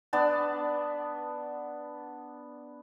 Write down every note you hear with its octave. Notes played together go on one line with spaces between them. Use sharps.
B3 D4 D5 A5